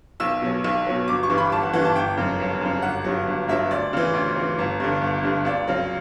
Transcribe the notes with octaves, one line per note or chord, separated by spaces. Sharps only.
B1 E6
B2 F#3
B1
B2 F#3
G1 D6
C#6
G2 E3
B5
G1 A5
F#5
G2 E3 F#5
A5
G1 G5
F#2 C#3
G1
F#2 C#3
G1 F#5
G2 F#3
G1
G2 F#3 E5
D2 D5
C#3 E3
D2
C#3 E3
G1
G2 D3
G1
G2 D3
C#2 D5
C#3 F#3